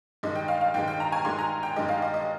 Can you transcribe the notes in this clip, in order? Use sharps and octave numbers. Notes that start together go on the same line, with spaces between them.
G2 D#3 G#3 D#5
G5
F5
F5
G2 D#3 G#3 G5
G5
A#5
G#5
G2 D#3 G#3 C6
A#5
G5
G2 D#3 G#3 D#5
F5
D#5
D#5